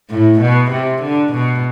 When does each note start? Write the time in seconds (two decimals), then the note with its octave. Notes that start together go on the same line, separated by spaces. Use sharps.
0.10 A2
0.40 B2
0.71 C3
1.02 D3
1.33 B2